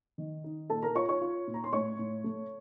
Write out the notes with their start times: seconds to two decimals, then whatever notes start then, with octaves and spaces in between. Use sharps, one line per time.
0.18 D#3
0.44 D#4
0.70 A#2 A4 A5
0.83 A#4 A#5
0.95 F4 C#5 C#6
1.09 C#5 C#6
1.21 F4
1.47 A#2
1.54 A#5
1.64 C6
1.73 A2 C#5 C#6
1.99 A2
2.24 A3